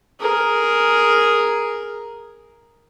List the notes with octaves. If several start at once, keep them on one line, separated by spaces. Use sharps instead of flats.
G#4 A#4